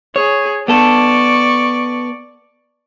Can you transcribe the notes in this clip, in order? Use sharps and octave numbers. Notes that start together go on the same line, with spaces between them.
G#4 C#5
B3 A4 D5 C#6